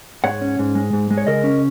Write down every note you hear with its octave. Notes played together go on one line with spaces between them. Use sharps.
G#2 C#5 F#5
C#4
G#2
G#3
G#2
G#3
C#5
C#3 A#4 D#5
C#4